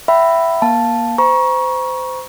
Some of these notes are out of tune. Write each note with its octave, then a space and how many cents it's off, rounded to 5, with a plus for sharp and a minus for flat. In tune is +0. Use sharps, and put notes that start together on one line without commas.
E5 +10 G5 -45 B5 +5
A#3 +25 F5 +0 A5 +0
C5 -25 A#5 +35 C#6 +0